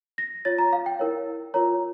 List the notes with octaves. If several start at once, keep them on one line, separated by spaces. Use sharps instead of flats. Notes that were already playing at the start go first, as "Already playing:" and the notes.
A#6
F4 C#5 A6
A#5
F5
G5
E4 A#4 C#5
F4 A#4 C#5 A#5